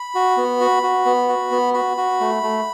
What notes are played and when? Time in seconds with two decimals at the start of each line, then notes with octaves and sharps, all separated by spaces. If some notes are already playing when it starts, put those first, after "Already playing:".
Already playing: B5
0.15 F#4
0.37 B3
0.60 F#4
0.83 F#4
1.05 B3
1.28 F#4
1.51 B3
1.74 F#4 B5
1.97 F#4
2.20 A3
2.43 A3